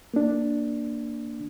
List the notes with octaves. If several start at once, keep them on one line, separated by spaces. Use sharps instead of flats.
A#3 D4